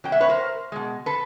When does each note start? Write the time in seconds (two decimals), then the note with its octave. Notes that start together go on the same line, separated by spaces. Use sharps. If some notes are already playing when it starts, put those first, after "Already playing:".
0.04 B2 F#3 G5
0.12 E5 F#5
0.20 B4 C#5
0.29 A#4 C5
0.72 B2 G#3
1.06 A4 B4